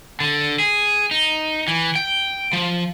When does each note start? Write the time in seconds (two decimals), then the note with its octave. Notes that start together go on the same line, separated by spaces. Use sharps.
0.20 D3
0.60 G#4
1.11 D#4
1.68 E3
1.95 G5
2.53 F3